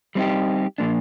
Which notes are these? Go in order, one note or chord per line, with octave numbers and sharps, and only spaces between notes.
G3 C4 D#4 G4
A#2 F3 A#3 D4